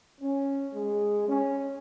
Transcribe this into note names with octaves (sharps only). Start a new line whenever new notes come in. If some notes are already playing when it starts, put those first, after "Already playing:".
C#4
G#3
C#4